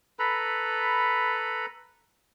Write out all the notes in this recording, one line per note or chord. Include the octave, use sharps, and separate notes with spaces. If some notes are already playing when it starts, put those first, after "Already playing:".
A4 B4 A#5 B5